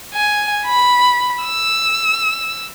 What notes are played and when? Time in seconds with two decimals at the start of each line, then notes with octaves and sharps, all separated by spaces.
0.14 G#5
0.66 B5
1.44 E6